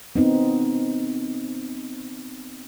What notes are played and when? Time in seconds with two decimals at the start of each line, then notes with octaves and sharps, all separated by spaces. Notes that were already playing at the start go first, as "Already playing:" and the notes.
0.16 B3 C4 D#4